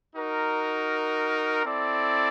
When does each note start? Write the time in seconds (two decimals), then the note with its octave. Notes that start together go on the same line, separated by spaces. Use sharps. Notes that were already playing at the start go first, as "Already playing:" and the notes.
0.15 D#4 F#4 A#4
1.65 C4 E4 A4 D5